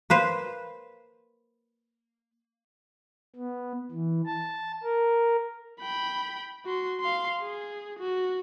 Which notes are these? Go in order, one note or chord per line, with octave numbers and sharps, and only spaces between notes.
A#3 B4 C5
B3
E3
A5
A#4
G5 B5
F#4 C6
F5 C6
G#4
F#4